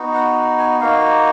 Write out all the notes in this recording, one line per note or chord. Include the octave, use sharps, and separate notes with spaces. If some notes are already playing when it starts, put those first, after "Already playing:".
Already playing: B3 D#4 F#4
F#5
G#5
A#3 D#4 F#4 F5